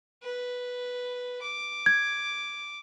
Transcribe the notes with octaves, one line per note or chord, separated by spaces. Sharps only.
B4
D6
G#6